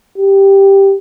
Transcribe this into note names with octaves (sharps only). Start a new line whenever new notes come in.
G4